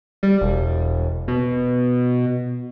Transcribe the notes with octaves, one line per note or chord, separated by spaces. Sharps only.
G3
E1
B2